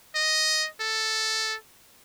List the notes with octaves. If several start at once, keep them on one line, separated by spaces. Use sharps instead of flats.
D#5
A4